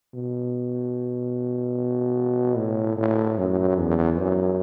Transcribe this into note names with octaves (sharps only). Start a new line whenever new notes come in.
B2
A2
A2
F#2
E2
F#2